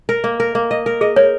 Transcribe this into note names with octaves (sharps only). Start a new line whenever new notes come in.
A#4
A#3
A#4
A#3
D#5
A#4
G#4 D#5
A#4 C#5